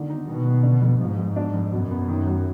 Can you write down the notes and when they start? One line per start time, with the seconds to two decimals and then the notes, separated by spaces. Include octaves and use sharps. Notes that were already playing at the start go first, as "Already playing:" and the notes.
Already playing: D3 D#3
0.10 D#4
0.27 B2 D#3
0.45 D#3
0.63 D3
0.82 F2
1.00 G#2 F3
1.18 F2
1.36 D4
1.54 F2
1.72 F#2 B2
1.91 B3
2.08 D#3
2.27 F#3